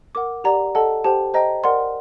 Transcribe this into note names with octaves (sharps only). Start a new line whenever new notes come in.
A#4 F#5 D6
G4 D5 F#5 A#5
A4 D#5 F#5 A5
G4 C5 G5 A5
C5 D#5 G5 A#5
A#4 D5 F#5 C6